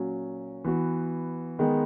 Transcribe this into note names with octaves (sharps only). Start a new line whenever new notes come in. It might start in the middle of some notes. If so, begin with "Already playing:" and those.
Already playing: A#2 F#3 C#4 F#4
E3 B3 F#4
D#3 G#3 B3